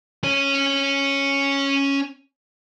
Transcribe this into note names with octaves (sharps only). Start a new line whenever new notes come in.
C#4 C#5